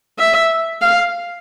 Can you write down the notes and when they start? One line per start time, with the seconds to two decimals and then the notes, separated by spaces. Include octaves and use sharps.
0.19 E5
0.82 F5